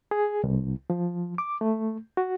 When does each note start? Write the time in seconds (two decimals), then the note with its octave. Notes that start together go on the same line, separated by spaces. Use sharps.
0.11 G#4
0.44 C2
0.90 F3
1.38 D6
1.61 A3
2.17 F#4